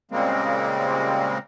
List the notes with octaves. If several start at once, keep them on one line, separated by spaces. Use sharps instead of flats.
A#2 C#3 G3 G#3 A#3 C4